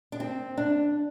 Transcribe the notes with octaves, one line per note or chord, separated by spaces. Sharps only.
D4
C4
D4